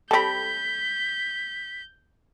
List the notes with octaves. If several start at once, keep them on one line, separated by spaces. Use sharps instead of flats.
G3 C4 A4 B5 G6 B6